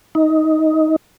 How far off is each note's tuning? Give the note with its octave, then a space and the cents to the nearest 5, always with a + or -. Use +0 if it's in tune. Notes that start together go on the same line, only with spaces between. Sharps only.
D#4 +15